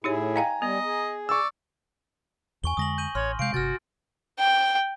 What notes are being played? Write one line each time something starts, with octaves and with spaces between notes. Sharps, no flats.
A2 D#4 E4 G4 G#4 C#5
D#5 F5 G5 G#5 A#5
G3 B3 D#5
G#4
D5 C#6 E6
E2 G#5 C#6 G7
F2 D3 G#3 D#6 A#6 F#7
G6 D#7 F#7
A1 C#5 C6 F6
C3 G#3 F5 G6 D7
G1 C3 F#4 F6 A6
G5